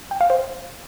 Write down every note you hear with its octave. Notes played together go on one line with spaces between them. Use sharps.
G5
F5
C5